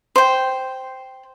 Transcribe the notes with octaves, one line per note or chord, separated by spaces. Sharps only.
C5 G5